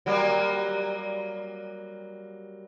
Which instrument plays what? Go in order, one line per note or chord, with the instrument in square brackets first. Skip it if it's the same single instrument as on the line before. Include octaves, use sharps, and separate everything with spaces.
[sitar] F#3 G3 A#3